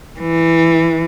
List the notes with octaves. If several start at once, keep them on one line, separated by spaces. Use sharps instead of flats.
E3